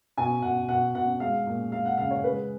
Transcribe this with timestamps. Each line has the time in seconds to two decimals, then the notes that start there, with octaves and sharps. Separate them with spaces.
0.17 B2 G#5
0.42 B2 F#5
0.69 B2 F#5
0.94 B2 F#5
1.20 G#3 F5
1.47 A#2
1.71 G#3 F5
1.85 F#5
1.98 C#3 F5
2.11 C#5
2.24 G#3 B4